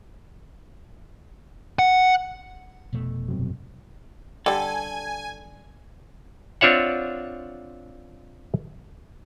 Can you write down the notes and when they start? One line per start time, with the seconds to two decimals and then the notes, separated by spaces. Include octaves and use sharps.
1.79 F#5
2.93 F1 B2 A3
3.28 G2 C3 F#3
4.46 D3 G3 A4 G#5
6.61 C4 D4 F4 C#5 E5 F#5